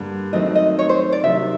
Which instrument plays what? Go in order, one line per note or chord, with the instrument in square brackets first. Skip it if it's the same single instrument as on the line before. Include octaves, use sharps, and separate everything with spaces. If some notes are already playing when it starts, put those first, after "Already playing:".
Already playing: [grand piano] G2 D3 G3 A#3
[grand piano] D#3 F#3 A3 C4 [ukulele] D#5
[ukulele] D#5
C#5
C5
D5
[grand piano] C3 D#3 F#3 [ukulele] E5